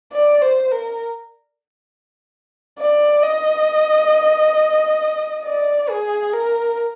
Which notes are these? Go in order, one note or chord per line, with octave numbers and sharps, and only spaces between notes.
D5
C5
A#4
D5
D#5
D5
G#4
A#4